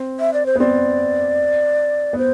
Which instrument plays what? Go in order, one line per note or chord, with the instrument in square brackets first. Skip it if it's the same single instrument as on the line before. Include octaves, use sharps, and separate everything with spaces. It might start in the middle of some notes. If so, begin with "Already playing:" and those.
Already playing: [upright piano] C4
[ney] E5
D5
C5
[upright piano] B3
[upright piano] C4 [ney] D5
[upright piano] B3
[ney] C5